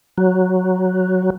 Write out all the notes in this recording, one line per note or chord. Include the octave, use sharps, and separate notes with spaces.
F#3